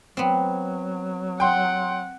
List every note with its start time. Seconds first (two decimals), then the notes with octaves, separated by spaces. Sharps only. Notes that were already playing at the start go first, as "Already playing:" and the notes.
0.17 F#3 B3 C4
1.40 F#5 G5 C6